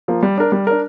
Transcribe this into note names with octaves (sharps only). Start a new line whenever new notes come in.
F3 A#3
G3
D4 A#4
G3
D4 A#4